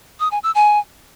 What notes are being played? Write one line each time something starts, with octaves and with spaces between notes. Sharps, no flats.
D#6
G#5
E6
G#5